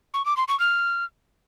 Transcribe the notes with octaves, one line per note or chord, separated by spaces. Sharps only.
C#6
D6
C6
C#6
F6